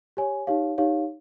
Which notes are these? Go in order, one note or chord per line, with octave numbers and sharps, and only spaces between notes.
G4 C#5 G#5
D#4 G4 C#5 F5
D#4 G4 C#5 F5